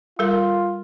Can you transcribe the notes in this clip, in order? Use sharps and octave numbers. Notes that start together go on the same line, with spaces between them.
G3 F4 A4 A#4